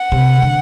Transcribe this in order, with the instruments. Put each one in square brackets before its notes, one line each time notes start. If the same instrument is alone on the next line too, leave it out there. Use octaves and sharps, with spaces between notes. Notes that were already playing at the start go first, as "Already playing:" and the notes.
Already playing: [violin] F#5
[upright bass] C3
D3